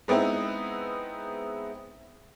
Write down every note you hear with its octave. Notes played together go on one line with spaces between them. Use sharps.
G#3 B3 C4 D#4 E4